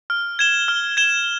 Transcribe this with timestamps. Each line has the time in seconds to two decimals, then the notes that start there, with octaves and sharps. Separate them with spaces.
0.10 F6
0.39 G#6 E7 G7
0.68 F6
0.97 G#6 E7 G7